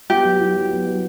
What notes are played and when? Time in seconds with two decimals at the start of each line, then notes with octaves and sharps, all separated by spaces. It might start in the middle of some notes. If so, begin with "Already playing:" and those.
0.10 B3 G4
0.25 F#3
0.40 E4
0.56 F#3
0.71 B3
0.86 F#3